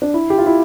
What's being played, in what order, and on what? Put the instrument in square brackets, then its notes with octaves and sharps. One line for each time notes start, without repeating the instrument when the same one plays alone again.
[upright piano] D4
E4
G4
F4
E4